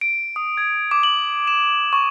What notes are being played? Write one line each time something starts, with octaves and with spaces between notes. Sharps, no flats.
D7
D#6
G#6
D6
F#7
E7
C#6